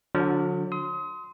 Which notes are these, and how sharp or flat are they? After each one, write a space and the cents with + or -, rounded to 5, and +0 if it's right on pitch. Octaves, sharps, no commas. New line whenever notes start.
D3 +0 F#3 -40 D4 -15
C6 -10 D#6 +35